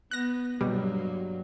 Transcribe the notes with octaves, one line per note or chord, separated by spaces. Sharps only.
B3 F#6 A#6
G2 B2 F#3 G3 A#3